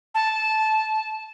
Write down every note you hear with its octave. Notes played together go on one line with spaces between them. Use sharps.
A5